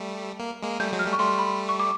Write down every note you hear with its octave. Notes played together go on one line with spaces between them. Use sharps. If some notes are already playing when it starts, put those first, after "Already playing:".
Already playing: G3 A3
A#3
G#3 A#3
G3 A3 G6
F#3 G#3
F6
G3 A3
C#6
G3 A3 C6
B5
C#6
D6